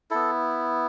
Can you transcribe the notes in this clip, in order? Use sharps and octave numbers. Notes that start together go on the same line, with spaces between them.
B3 E4 A4